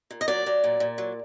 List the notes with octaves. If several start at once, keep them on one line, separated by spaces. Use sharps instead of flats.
A#2
D#5
F#3 D5
F#3
A#2
A#2
F#3